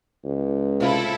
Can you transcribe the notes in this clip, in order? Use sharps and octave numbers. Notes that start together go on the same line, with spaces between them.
C#2
C3 E4 F4 A4